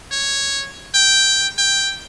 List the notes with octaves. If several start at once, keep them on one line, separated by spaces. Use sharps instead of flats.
C#5
G5
G5